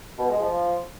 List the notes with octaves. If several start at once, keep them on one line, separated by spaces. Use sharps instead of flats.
B2
G#3
F3